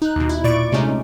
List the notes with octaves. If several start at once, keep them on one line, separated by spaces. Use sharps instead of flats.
D#4 F#6
D#2 B2
E4
A#2 D5 C#6 D7
C3 G#3 A3 C#4 D#4